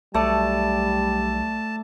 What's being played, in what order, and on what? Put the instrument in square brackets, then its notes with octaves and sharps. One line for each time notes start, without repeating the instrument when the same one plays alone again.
[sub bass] B1 [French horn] G3 [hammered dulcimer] A3 D5 [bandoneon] A5